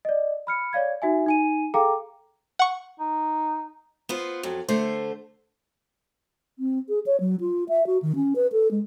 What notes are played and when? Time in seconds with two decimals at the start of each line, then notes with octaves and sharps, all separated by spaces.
0.05 D5 D#5
0.47 B5 F6 C#7
0.73 C#5 D5 F5 G#6
1.02 D#4 F#4 E5 G#5
1.26 D#4 G#5 D#7
1.74 G#4 A4 F5 G5 A#5 D6
2.59 F#5 C#6
3.00 D#4
4.09 B3 F4 C5
4.43 F2 F#3
4.68 D3 A3 C5
6.59 C4
6.89 G#4
7.06 C#5
7.20 F#3
7.41 F4
7.69 E5
7.87 F#4
8.02 D#3
8.16 C#4
8.36 B4
8.52 A4
8.71 G#3